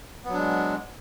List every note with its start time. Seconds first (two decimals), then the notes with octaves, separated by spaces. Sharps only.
0.24 B3
0.29 F#3
0.33 D4
0.37 G#3